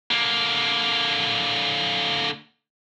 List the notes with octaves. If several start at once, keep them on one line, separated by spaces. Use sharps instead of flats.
D3 A#3